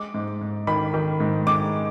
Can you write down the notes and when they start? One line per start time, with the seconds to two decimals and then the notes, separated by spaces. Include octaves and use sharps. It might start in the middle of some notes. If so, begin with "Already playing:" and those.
Already playing: G#3 D6
0.14 G#2
0.41 G#2
0.67 D#3 B5
0.94 D#3
1.20 G#2
1.47 G#3 D6